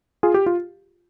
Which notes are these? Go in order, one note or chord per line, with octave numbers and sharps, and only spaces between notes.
F4 G#4
G4
F4